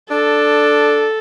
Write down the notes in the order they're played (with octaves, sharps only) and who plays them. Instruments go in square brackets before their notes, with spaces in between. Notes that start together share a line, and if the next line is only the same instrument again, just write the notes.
[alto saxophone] D4 [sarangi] A4